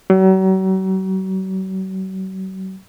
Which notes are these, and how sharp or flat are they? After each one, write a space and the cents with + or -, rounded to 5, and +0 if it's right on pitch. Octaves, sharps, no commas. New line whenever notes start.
F#3 +40